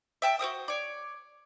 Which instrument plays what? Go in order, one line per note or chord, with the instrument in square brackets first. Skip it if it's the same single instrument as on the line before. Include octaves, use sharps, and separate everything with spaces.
[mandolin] E5 G5 A5
F#4 A#4 C5 D#6
C#5 D5